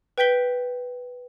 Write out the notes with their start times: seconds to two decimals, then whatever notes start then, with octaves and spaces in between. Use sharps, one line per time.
0.18 B4 G5 G6 B6 G7